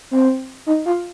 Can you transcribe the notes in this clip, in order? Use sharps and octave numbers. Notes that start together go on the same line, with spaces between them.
C4
D#4
F4